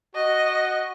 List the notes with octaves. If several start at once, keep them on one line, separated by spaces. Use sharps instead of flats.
F#4 D#5